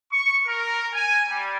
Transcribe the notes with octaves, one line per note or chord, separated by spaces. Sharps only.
C#6
A#4
G#5
G3